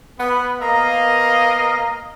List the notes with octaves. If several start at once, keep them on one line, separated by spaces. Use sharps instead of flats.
B3
A#3 B3 A#4 D#5 F5